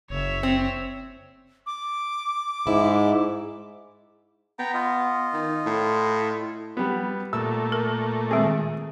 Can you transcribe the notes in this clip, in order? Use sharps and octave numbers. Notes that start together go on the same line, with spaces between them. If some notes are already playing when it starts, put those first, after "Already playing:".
F#1 C#5 E5
C4
D6
G#2 E4
B3 G5 A#5
F4 D#5
D#3
A2
G3 B3
A#2 A3 E6
A#4
D#3 G#3 C4 G#4